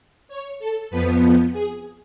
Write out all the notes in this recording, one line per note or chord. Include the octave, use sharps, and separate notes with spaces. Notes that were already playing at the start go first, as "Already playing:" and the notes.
C#5
A4
F2 F3 B3 B4
G#4